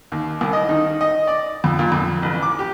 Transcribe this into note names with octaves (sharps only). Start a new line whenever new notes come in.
D#2
C2
D#5
D#3
D#5
D5
F2
A#2
F2
A1
D6
G4